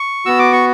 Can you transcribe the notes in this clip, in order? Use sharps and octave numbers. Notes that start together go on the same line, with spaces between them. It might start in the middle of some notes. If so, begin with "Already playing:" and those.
Already playing: C#6
B3 F#4 E6
D6
C#6